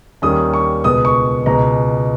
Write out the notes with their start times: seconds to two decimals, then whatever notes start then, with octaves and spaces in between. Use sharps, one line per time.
0.22 D#2 D#3 G3 C#4 D#6
0.53 C#6
0.84 C#2 B2 G#3 B3 D#6
1.05 C#6
1.46 C#2 B2 G#3 A#5